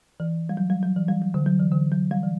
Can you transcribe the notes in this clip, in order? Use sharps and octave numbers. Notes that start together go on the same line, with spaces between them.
E3
G3
F#3
G3
F#3
E3
G3
F#3
D3
F#3
E3
D3
F#3
G3
E3